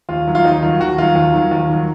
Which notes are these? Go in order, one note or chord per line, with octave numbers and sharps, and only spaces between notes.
D#2 F4
D#3 F#3
F4
D#2 D#4
D#3 F#3 F4
D#2 F#4
D#3 F#3 F4
D#2
D#3 F#3
D#2
D#3 F#3